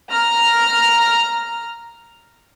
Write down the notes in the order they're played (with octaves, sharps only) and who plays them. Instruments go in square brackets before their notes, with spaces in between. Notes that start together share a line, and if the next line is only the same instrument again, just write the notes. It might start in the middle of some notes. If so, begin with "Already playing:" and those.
[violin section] A#5 F6